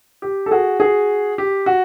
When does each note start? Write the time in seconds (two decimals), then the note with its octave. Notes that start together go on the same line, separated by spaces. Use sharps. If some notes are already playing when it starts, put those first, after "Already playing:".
0.22 G4
0.46 A4
0.51 F#4 G#4
0.80 F#4 G#4
1.38 G4
1.66 F#4